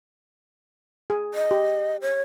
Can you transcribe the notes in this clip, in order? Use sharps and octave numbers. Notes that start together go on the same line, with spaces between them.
G#4 G#5
D#5
G4
C#5